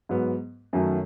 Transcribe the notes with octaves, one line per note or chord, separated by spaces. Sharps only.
G#2 F#3 B3
F#2 D#3 F#3 A3